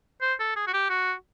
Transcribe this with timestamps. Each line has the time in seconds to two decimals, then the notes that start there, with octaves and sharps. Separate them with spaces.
0.22 C5
0.40 A4
0.56 G#4
0.67 F#4
0.73 G4
0.89 F#4